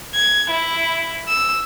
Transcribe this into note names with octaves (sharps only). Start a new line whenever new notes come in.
G#6
E4
E6